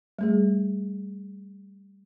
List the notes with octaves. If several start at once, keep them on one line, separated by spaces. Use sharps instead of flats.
G3 A3 G#4